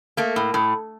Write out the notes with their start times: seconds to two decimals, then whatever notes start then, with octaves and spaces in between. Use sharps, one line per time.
0.17 A3 A#3
0.36 A2
0.54 A2